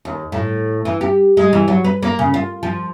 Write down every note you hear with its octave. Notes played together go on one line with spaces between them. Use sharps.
D#2
A2
E3
G4
G#3
E3
F#3
B4
A#3
C#3
F4
F3